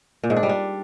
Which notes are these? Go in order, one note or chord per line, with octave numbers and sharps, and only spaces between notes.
A#2
G#2
D4
G3
D4